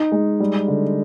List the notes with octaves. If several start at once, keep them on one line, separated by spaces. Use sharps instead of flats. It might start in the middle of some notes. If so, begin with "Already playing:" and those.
Already playing: D#4
G#3
G3
D3